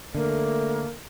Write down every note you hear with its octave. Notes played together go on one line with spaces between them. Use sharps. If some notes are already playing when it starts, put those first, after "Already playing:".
D3 A3 A#3